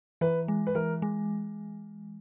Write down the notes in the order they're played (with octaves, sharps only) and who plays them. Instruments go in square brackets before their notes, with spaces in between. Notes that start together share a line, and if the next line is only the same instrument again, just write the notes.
[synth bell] E3 [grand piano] B4
[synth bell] G#3
[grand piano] B4
[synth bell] E3 [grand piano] A#4
[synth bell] G#3